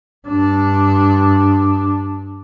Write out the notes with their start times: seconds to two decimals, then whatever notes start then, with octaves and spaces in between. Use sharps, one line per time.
0.28 G2 D4